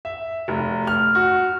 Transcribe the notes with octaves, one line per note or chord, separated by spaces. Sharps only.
E5
F1
F6
F#4